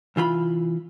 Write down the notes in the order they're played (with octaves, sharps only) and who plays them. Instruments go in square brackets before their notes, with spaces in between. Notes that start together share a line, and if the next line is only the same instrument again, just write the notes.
[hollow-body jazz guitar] C2 E3 F4 B5